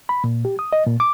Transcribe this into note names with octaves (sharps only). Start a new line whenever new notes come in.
B5
A#2
G4
D#6
D#5
A#2
D6